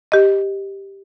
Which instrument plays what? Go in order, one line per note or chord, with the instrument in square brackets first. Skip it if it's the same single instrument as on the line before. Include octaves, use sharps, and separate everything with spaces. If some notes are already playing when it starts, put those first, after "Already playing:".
[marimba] G4 D#5